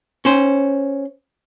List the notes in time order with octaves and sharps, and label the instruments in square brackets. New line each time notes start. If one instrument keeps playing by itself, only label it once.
[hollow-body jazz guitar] C#4 C5